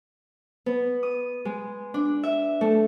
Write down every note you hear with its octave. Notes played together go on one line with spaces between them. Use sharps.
B3
D#6
G#3
D4
E5
A3